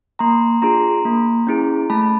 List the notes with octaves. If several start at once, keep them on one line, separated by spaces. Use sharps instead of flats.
A#3 A#5 C6
D4 F4 G#4 A#5 C6
A#3
C#4 E4 G#4
A3 A5 B5